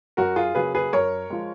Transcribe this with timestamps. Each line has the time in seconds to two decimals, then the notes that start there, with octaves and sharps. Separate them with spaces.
0.17 F#2 F#4 A#4
0.36 F4 G#4
0.55 C#3 F#3 A#3 G#4 B4
0.75 G#4 B4
0.93 F#2 A#4 C#5
1.30 F3 G#3